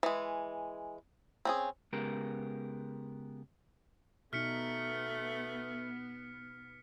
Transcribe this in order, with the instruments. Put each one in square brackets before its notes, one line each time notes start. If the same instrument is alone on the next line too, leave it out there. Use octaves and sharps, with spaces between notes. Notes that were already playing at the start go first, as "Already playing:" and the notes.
[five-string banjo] E3 G#3
C4 C#4 G#4
[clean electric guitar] C#3 G#3 B3 G4 A#4
[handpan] B2 D#4 [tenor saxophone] A3 [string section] B3 [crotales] F6 B6 C#7